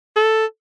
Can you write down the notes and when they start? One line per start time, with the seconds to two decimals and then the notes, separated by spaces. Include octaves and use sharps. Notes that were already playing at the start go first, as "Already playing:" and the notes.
0.16 A4